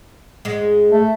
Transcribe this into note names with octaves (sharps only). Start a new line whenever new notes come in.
G#2 G#3
A3